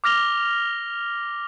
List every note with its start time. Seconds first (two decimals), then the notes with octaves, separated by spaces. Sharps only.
0.04 D6 F6 A#6 F7 G7